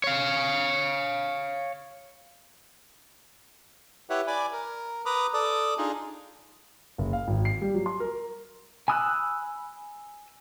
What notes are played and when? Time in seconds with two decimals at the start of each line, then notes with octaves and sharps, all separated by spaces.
0.04 C#5 F5
4.10 E4 G4 B4 C#5 E5 F#5
4.27 D5 G#5 B5 D6
4.52 A#4
5.06 B4 A#5 B5 D6 D#6
5.34 A4 D5 D6 D#6
5.78 D4 D#4 F4 G#4 D#5
6.98 F#1
7.13 F5
7.28 G#1
7.45 C7
7.62 G3
7.74 F#3
7.86 C6
8.00 A#4
8.88 G#5 B5 D#6 E6 F#6